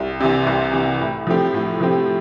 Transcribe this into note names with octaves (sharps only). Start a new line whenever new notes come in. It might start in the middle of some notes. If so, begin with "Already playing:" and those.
Already playing: C2
C3 E3
C2
C3 E3
A2
F3 A3 C4 G4
A2
F3 A3 C4 G4